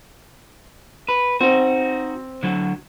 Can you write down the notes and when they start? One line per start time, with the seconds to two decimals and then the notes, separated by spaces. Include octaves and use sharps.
1.09 B4
1.41 C4 D#4 F#4
2.43 D3 F#3